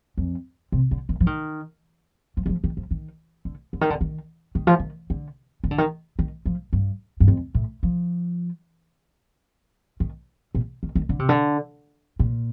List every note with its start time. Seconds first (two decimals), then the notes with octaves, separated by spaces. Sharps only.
0.18 F2
0.72 C3
0.91 D3
1.09 D#3
1.20 F3
1.27 D#3
2.37 F3
2.46 D#3
2.49 F3
2.64 D#3
2.77 F3
2.91 D#3
3.45 D3
3.73 D3
3.81 D#3
3.90 D3
4.01 D#3
4.55 D#3
4.67 F3
4.79 D#3
5.10 D3
5.64 D#3
5.71 D3
5.78 D#3
6.19 D#3
6.45 F3
6.73 G2
7.20 G2
7.28 F2
7.55 A2
7.83 F3
10.00 D#3
10.55 A#2
10.83 D#3
10.95 D#3
11.09 D3
11.19 C3
11.29 D3
12.19 A#2